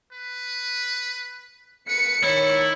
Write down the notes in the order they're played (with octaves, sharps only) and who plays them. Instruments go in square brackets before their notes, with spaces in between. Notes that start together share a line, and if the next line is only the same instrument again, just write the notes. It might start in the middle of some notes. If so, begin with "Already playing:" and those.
[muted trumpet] B4
[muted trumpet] B4 [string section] C#7
[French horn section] D#3 C#5 [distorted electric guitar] E4 [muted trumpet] D5